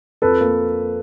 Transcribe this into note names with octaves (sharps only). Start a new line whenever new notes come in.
F2 A4 B4
A#3